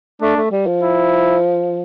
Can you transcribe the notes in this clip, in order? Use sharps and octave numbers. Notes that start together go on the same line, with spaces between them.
A3 D4
A3
G3
F3
E4